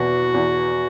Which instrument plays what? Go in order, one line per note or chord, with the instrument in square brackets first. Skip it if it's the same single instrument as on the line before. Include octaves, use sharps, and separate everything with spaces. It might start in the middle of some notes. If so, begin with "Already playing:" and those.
Already playing: [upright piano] E2 B2 [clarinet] F#4
[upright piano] E2